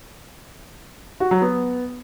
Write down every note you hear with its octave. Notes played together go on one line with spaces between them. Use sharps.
F#4
F#3
B3